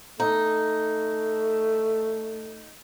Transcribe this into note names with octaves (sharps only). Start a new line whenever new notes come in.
A3 D#4